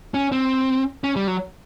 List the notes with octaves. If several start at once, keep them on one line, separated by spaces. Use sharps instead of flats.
C#4
C4
C#4
G3
F#3